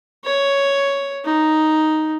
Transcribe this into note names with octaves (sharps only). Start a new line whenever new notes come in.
C#5
D#4